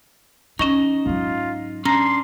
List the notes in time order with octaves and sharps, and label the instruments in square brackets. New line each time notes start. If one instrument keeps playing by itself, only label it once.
[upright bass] E3 [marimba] C#4 C#6 [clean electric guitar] D#4 D#5
[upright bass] G#2 F#3 [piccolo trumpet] F4
[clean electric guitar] C#4 D4 [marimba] A#5 A#6 [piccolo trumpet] C6